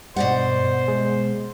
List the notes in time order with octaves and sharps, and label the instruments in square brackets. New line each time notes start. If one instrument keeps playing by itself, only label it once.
[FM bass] G2 [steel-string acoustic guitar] B2 D5 F#5 [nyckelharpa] C5
[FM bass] G#3